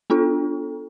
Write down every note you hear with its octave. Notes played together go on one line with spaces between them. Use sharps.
B3 D4 F4 A4